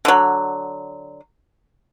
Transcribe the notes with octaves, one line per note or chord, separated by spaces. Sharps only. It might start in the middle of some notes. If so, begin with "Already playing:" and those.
D3 F#3